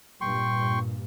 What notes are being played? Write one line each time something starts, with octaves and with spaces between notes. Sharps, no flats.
G2 A#2 G5 C6 C#6